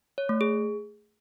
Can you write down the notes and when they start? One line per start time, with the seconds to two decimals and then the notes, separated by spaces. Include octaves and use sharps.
0.18 C#5
0.29 A3
0.41 G#4